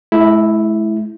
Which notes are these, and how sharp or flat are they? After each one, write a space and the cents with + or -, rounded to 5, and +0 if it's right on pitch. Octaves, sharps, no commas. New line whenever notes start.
G#3 +45 E4 +0